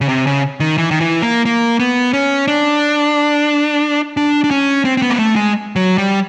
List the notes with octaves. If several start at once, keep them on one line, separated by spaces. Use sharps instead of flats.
C#3
C3
C#3
D#3
E3
D#3
E3
A#3
A#3
B3
C#4
D4
D4
D4
C#4
C4
C4
B3
A#3
A3
G#3
F#3
G3